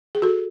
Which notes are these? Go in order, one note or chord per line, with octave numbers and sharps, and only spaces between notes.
G#4
F#4 A4